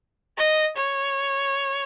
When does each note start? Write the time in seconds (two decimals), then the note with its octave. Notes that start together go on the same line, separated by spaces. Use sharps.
0.38 D#5
0.77 C#5